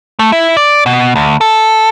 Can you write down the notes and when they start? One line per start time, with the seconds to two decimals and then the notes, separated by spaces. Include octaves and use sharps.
0.19 A3
0.32 E4
0.57 D5
0.86 B2
1.16 D2
1.41 A4